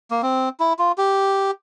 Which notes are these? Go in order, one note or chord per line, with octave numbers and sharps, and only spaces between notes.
A#3
C4
E4
F4
G4